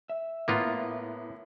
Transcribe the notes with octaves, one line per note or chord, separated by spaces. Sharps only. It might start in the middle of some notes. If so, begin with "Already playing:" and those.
E5
A2 A#3 B3 F4